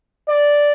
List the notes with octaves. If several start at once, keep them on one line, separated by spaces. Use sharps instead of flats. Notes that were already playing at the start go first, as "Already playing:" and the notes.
D5